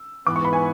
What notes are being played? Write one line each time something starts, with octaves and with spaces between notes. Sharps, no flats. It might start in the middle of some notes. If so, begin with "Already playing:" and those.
Already playing: E6
G#2 E3 B3 D6
C#6
B5
G#5